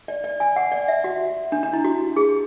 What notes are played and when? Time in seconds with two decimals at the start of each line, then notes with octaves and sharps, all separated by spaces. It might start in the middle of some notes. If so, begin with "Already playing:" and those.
0.08 D5
0.24 D5
0.40 G#5
0.56 F#5
0.72 D5
0.88 E5
1.04 F#4
1.52 D4
1.63 D4
1.73 E4
1.85 F#4
2.16 G#4